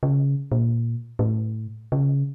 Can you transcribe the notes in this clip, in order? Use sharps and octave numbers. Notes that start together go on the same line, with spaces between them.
C#3
A#2
A2
C#3